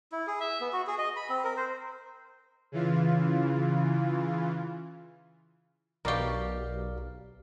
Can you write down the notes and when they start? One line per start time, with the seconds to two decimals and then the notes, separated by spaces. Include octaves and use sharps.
0.12 E4
0.27 G#4
0.40 E5
0.61 B3
0.73 F#4
0.87 G#4
0.98 D#5
1.16 B5
1.29 C4
1.44 A#4
1.57 C5
2.72 C#3 E3 F4
6.05 B1 B2 G4 A#4 D5 F5